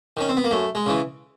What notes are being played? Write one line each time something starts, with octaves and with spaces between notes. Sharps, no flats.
D#3 C#4
C4
B3
A#3
F#2 A3
G#3
C#3 E3